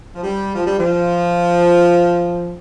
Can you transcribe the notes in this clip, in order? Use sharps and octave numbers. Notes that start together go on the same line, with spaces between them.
F3
G3
F3
G3
F3